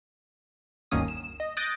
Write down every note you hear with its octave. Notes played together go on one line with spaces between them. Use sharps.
G1 D2 D#3 A#3 C#4 D#6
E7
D#5
D#6 F#6 G6 A6 A#6 D7